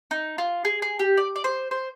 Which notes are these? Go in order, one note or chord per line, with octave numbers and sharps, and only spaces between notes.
D#4
F4
G#4
G#4
G4
D5
D5
C5
C5